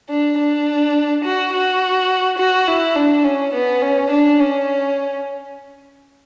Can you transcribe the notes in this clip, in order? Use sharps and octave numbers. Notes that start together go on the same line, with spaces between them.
D4
D4
F#4
F#4
F#4
E4
D4
C#4
B3
C#4
D4
C#4